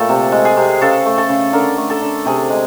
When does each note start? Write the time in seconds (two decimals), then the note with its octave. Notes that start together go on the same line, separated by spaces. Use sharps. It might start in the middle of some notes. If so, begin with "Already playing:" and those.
Already playing: A#2 A3 A4
0.09 C3
0.32 G#3
0.45 G#4
0.57 C3
0.81 C#3 A4
1.06 A3
1.18 A4
1.29 C#3
1.53 D3 A#4
1.77 A3
1.90 A4
2.02 D3
2.26 C3 G#4
2.50 G#3